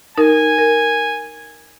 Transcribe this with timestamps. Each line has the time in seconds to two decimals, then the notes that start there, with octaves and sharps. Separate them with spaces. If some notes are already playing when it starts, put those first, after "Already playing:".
0.18 D#4 A#4 G#5
0.58 A#4